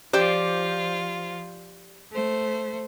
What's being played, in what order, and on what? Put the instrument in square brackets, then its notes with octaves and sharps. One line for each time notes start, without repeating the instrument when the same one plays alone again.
[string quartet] F3 F4 [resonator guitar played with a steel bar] G4 C5 D5
[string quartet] A3 C5